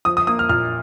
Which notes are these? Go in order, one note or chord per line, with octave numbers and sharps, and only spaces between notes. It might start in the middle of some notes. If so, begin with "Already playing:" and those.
F3 D#6
D#6
A#3 D#6
F6
A#2 F6